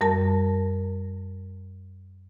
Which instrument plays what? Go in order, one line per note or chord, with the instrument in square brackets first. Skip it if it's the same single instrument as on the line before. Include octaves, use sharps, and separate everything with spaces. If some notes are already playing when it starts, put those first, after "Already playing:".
[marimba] F#2 G3 A#4 A5